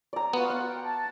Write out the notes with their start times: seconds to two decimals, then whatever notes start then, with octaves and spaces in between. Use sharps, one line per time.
0.13 D5 A#5
0.33 B3 F4 F#4
0.50 F#5
0.67 G5
0.83 A5